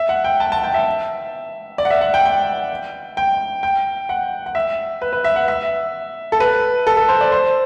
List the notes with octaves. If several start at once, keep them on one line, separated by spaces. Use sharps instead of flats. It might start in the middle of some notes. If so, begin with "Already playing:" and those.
Already playing: E5
F#5
G5
A5
A5
G5
E5
D5
F#5
E5
F#5
G5
G5
G5
G5
F#5
F#5
E5
B4
B4
E5
F#5
E5
A4
B4
A4
A4
C5
D5
C5